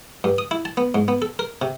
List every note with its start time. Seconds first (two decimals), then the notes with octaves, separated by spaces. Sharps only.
0.24 G2
0.38 D#6
0.51 E4
0.65 A5
0.77 B3
0.95 G#2
1.08 B3
1.22 A4
1.39 A#4
1.62 C3